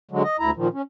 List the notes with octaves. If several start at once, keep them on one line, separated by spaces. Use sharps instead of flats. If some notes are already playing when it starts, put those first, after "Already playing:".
D3 F#3 G#3
D#5
D2 E4 A#5
A#2 D#3 F3
C#4